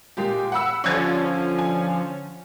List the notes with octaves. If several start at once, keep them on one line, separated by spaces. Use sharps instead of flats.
A#2 G#3 G4
F#5 B5 E6
D3 F3 C#4 C#6 G#6 A6
G#5